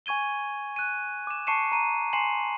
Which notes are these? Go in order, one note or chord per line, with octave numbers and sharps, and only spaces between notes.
G#5 C#6 G#6 D#7 G7
F#6 D#7
D6 E7
A5 C#6 C7 C#7 D#7 E7
A#5 D#7
G#5 C6 C7 C#7 E7 F#7